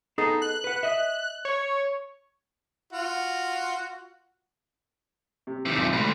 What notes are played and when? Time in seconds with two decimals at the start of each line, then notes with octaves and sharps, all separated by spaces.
0.18 B3 D#4 G#4 A4
0.42 F#6
0.64 B4 F#5
0.83 D#5 E5
1.45 C#5
2.93 F4 F#4
5.47 C3
5.66 C3 D#3 E6
5.77 B1 F4 D#5
5.93 D2 G#2 B5